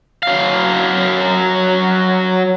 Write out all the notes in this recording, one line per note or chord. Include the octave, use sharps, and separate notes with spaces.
F#3 F5